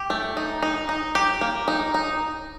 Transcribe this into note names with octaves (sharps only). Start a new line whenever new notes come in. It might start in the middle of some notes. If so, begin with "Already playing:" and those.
Already playing: G4
A3
D#4
D#4
D#4
G4
A#3
D#4
D#4